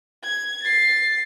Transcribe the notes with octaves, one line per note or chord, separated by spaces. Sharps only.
G#6
A6 C7